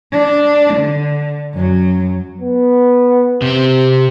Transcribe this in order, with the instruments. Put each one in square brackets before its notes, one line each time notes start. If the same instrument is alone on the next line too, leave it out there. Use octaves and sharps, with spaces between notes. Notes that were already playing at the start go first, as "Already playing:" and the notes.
[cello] D4
D3
F#2 F#3
[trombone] B3
[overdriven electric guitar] C3 C4 [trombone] G4